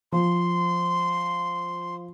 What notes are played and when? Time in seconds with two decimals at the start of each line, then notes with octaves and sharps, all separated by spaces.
0.12 F3 C6